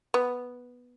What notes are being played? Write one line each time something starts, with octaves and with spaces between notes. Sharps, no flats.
B3